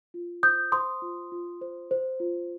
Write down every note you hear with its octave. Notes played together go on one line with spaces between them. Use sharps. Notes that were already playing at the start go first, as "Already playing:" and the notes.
F4
C5 D#6 G6
C5 C6 D#6
F4
F4
C5
C5
F4